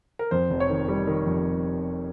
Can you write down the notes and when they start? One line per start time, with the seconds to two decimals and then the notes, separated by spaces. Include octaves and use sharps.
0.19 A#4
0.31 F2 C5
0.50 F1
0.60 C#5
0.70 D#3
0.88 G3
1.07 D#3
1.27 F2